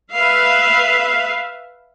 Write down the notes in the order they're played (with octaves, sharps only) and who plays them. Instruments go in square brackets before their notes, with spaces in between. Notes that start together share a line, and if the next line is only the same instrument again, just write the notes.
[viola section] B4 E5 F5